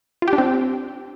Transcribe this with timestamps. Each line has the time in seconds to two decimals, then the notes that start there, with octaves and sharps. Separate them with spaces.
0.22 F4
0.28 G4
0.33 D4
0.38 C4